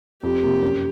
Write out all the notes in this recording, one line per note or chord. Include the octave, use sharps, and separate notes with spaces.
F2 G4
C3 F3 A#3
F#2